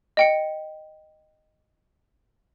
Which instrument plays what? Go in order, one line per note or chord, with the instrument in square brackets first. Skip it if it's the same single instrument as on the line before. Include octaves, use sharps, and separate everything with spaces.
[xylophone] D#5 G5 C#7